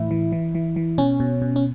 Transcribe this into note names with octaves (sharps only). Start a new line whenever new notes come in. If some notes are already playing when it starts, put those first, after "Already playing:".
Already playing: A2 E3 E4
E3
E3
E3
E3
B2 C#4
B2
B2
C#4